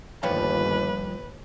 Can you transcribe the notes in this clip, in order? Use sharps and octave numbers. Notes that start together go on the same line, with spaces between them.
G1 D#2 F3 G3 B4 C#5